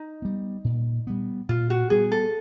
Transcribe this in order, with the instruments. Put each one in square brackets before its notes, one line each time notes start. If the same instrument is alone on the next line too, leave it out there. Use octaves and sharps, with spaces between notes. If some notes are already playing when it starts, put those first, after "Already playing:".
Already playing: [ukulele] D#4
[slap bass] G3 B3
A#2
G3 B3
[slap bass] A#2 [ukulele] F4
[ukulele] F#4
[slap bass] G3 B3 [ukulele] G#4
[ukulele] A4